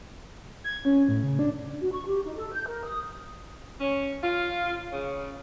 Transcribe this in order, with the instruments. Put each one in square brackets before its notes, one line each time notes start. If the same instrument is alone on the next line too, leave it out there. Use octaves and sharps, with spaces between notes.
[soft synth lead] G#6
C#4
A2
C#3
D4
[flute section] F#4
C#6
G4
D#4
A4
G6
A#4
D#6
[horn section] C#4
F4
C#3